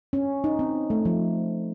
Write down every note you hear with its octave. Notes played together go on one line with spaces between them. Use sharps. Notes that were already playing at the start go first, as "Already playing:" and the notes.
C#4
D#4
C4
A3
F3